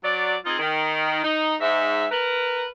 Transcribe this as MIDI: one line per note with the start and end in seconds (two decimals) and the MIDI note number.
0.04 0.35 54
0.04 0.35 74
0.45 0.58 60
0.45 0.58 63
0.45 0.58 65
0.45 0.58 68
0.59 1.19 51
1.24 1.55 63
1.61 2.05 44
1.61 2.05 76
2.11 2.66 70
2.11 2.66 71